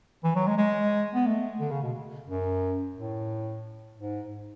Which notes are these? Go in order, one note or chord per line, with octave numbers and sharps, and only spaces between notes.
E3
F#3
G#3
G#3
B3
A3
D3
C#3
B2
F#2
A2
G#2